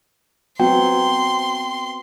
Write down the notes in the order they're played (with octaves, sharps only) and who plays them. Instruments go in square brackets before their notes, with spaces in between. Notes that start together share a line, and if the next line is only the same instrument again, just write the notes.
[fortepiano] F#3 [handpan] B3 C4 [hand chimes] G5 [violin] C6